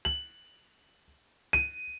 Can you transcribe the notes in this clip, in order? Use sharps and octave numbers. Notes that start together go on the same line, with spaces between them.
F#7
D#7